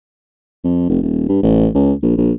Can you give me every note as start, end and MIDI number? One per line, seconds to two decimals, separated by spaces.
0.64 0.84 41
0.89 1.01 29
1.03 1.28 27
1.29 1.42 43
1.43 1.69 33
1.75 1.93 37
2.02 2.16 34
2.17 2.32 34